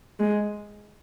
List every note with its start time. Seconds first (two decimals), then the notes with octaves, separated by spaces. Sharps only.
0.20 G#3